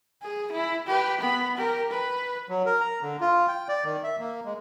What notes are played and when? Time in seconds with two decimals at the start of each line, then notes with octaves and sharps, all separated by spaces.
0.22 G#4
0.52 E4
0.87 G4 B4
1.21 B3 B5
1.57 G4 A#4
1.91 B4
2.49 F#3
2.66 A#4
2.80 A#5
3.02 D3
3.21 F4
3.48 G5
3.69 D5
3.85 D#3
4.04 E5
4.19 A#3
4.45 G#3